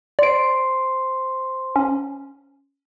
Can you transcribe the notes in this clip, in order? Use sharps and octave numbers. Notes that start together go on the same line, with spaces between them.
C5 D5 C6 D7
C#4